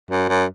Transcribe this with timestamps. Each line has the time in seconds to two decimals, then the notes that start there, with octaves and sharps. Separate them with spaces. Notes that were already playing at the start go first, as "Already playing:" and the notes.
0.11 F#2
0.29 F#2